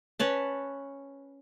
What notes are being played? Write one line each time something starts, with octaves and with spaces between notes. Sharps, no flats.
C#4 B4 C#5 A5